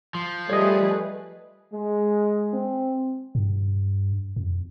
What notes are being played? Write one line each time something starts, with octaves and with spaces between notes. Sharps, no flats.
F3
G3 A3 G#4 B4 C#5 D#5
G#3
C4
G2
F2